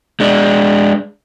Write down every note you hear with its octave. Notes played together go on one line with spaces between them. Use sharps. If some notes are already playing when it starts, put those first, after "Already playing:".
G#3 D4